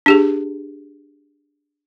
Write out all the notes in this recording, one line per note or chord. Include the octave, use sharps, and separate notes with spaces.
D4 G4 G#4